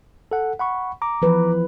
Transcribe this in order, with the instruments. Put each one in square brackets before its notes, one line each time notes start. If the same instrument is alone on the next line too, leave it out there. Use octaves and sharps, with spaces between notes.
[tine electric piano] A4 F#5
F#5 B5 C#6
A#5 D6
[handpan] E3 F3 B4